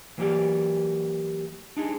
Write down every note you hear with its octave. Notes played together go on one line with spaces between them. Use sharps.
E3 F#3 A#3 G4 D5
D4 D#4 G#4